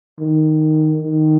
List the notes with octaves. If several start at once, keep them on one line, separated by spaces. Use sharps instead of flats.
D#3
D#3